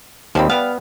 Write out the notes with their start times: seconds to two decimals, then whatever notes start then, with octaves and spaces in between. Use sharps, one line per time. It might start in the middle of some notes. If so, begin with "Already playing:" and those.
0.35 D#2 F3 G3 C4 B5
0.49 G3 B3 F5